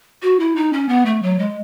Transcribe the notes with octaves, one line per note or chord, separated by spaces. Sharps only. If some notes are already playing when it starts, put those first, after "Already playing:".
F#4
E4
D#4
C#4
B3
A3
F#3
G#3